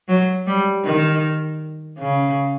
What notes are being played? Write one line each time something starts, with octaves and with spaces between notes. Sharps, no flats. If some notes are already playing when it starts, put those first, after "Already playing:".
F#3
G3
D#3
C#3